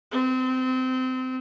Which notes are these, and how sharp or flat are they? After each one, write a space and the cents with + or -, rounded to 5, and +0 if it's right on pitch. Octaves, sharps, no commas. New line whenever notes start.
C4 -25